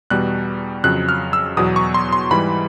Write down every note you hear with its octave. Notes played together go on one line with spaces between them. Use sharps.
E2 B2 G3 F#6
F2 C#3 F#3 F#6
F6
E6
E2 B2 F#3 D#6
C#6
C6
C6
G#2 E3 G3 B5